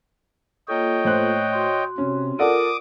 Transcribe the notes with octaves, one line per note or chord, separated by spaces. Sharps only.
A#3 F4 A4 C#5 D#5 G5
A2 C5 F#6
F#4 C6
C3 C#4
F4 A4 A#4 D5 F#5 D6 D#6